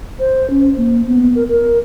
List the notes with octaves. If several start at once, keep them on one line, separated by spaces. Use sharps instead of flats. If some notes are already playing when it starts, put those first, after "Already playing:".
C5
C#4
A#3
B3
A#4
A#4